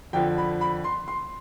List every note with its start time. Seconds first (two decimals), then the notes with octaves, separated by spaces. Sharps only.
0.13 F2 D3 F3 G5
0.38 B5
0.61 B5
0.84 C6
1.08 C6